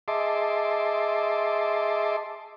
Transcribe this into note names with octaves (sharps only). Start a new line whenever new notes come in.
G#4 D#5 E5 A5 C6 D6